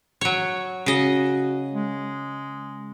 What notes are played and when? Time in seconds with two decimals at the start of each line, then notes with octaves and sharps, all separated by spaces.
0.21 F#3 C#5
0.86 C#3 F#4 D#5
1.73 G#3